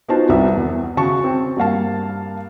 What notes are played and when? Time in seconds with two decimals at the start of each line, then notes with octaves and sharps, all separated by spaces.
0.08 B3 D#4 F4 F#4 C5 A5
0.29 C2 B4 E5
0.56 E2
0.97 C#3 F#4 A5 C#6
1.24 C4
1.57 G2 A#3 F5 A5